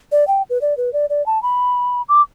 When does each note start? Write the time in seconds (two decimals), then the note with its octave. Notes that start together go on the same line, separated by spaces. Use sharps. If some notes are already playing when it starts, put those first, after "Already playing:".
0.12 D5
0.28 G5
0.50 B4
0.61 D5
0.77 B4
0.93 D5
1.10 D5
1.26 A5
1.43 B5
2.09 D6